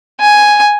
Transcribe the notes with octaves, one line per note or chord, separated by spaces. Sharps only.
G#5